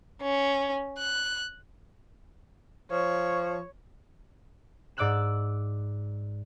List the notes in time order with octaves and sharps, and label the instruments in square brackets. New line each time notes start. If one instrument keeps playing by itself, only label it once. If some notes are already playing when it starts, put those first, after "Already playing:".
[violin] C#4
F#6
[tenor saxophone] F3 [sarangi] C#5
[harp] G#2 D5 D6 E6 F#6 E7